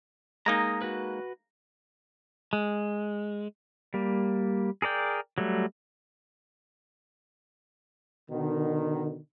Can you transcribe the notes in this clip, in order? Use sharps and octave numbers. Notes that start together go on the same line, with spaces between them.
G#3 A#3 D#4 A#5 D#6
F#4 B4
G#3
G3 A#3
G#4 A#4 D5 G5
F#3 G3 A3
B2 D3 D#3